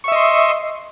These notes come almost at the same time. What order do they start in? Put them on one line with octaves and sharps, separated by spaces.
C#6 E5 D#5 C6